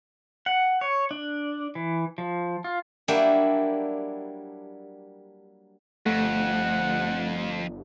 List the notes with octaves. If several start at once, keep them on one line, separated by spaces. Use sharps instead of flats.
F#5
C#5
D4
E3
F3
F4
F#3 G3 A#3 D4 E4 G4
G1 F2 A3 F#5